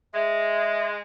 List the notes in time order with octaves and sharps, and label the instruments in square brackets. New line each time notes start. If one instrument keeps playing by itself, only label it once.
[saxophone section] G#3 [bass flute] E5